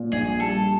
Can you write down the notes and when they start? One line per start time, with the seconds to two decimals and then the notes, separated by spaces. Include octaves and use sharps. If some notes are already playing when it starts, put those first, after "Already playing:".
Already playing: A#2
0.12 A#1 G#4
0.39 G3 A4